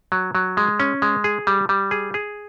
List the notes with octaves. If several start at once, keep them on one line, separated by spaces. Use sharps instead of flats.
F#3
F#3
G#3
C#4
G#3
G#4
G3
G3
G#4
G#4